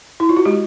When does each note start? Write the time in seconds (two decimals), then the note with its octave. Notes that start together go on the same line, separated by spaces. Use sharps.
0.20 E4
0.29 F4
0.37 F#4
0.45 G#3 G4